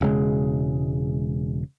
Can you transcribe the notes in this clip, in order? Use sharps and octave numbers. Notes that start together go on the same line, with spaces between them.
E1 C#3 G#3